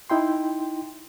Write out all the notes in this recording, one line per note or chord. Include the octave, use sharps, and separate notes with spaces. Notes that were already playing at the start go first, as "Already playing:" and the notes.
D#4 E4 G5 C6